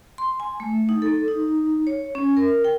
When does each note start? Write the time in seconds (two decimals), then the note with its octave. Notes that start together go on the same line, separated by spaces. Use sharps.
0.18 C6
0.40 G#5
0.60 A3
0.89 D#4
1.02 A4
1.28 D#4
1.87 C#5
2.15 C#4
2.37 A#4
2.65 G5